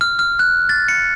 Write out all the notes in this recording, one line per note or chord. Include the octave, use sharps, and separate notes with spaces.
F6
F6
F#6
A6
C#7